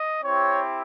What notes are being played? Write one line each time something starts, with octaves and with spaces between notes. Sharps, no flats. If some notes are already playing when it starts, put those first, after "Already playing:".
Already playing: D#5
C4 E4 G4 C#5